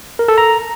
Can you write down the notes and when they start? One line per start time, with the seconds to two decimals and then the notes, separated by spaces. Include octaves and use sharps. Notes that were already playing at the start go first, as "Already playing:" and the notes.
0.19 A#4
0.28 A4
0.38 A#5